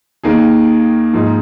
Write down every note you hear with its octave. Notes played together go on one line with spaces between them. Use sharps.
D#2 D#3 A#3 D#4 G#4
G#2 F3 A#3 D#4 G#4